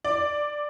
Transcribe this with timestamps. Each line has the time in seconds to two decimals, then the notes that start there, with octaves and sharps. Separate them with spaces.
0.05 D5